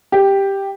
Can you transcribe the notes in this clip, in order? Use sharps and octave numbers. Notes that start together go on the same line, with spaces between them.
G4